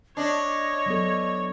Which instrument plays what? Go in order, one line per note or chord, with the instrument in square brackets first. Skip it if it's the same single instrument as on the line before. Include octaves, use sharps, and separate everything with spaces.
[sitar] D4 [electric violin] C#5 [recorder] D#5
[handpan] F#3 B3 A4